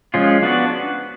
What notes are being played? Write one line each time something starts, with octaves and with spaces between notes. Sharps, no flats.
F3 G#3 C#4 F4
B3 D4 F#4 B4